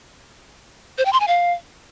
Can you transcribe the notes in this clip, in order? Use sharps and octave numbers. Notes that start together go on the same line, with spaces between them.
C5
G5
C6
G#5
F5